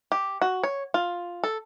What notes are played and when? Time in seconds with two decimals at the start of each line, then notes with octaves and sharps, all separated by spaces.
0.12 G4
0.42 F#4
0.63 C#5
0.94 F4
1.44 A4